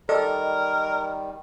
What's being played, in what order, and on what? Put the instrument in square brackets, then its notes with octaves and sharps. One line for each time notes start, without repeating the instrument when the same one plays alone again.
[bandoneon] D#3 G3 [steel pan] A4 [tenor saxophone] A#4 [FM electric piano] D5 D#5